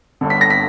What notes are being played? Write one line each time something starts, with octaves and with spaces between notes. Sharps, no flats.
G1 G2 D3
B6
A#6
B6